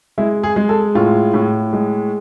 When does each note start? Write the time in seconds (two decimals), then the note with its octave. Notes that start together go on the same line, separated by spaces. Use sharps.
0.18 G#3 E4
0.43 G#4
0.56 G#3
0.69 A4
0.95 A2 F4
1.34 A2
1.73 G#3